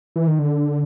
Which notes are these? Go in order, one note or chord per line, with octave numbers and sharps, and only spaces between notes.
E3
D#3
D3